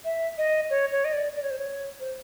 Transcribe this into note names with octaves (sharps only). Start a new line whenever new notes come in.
E5
D#5
C#5
C#5
D#5
D5
D5
C#5
C5
C#5
C5